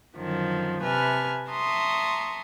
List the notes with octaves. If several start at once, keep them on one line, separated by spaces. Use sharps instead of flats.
F#2 D3 D#3 F3
C3 B4 E5 G#5 A5 F6
E5 A5 A#5 C6 C#6 D#6